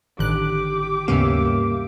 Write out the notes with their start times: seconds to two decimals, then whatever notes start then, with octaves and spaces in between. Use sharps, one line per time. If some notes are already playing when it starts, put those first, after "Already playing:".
0.19 A1 D3 D#3 D4 G4 D6 F#6
1.08 D#2 G#2 C#3 G3 A#3 B3 C#4 E5